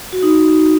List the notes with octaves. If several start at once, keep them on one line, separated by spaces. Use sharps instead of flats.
F#4
D#4